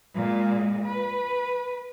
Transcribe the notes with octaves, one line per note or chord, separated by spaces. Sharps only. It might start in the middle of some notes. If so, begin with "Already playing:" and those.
A#2 G#3
B4